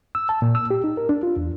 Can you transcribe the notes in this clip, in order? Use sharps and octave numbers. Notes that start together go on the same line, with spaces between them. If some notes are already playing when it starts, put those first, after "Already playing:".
E6
A5
A#2
E6
G4
D#4
A#4
D4
F4
E2